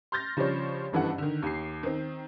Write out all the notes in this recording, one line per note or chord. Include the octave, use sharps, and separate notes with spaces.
C6 F6 G6 A6 A#6
C#3 F3 G3 D4 C5 C#5
F#1 G2 E3 A4 F#5
D3 D#3
D#2 C7
D#3 C4